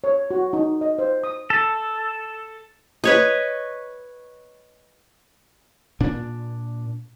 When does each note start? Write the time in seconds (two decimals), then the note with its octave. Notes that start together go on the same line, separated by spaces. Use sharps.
0.04 C#5
0.31 F#4
0.53 D#4
0.81 D#5
0.99 C5
1.24 D#6
1.50 A4
3.04 B4 C#5 D#5
6.00 A#2 D4